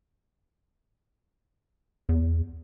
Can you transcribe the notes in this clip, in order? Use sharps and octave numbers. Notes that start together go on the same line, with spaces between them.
E2